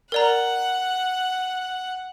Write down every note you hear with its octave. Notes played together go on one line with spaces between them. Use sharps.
A#4 D5 F#5 A#5